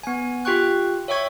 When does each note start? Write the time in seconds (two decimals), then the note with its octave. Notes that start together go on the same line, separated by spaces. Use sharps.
0.03 B3 G#5
0.45 F4 G4 G5 C#6 F#6
1.08 C#5 E5 G5 C#6 G#6